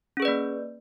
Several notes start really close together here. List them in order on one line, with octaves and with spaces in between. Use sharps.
C#4 G#4 B4 D5 A#3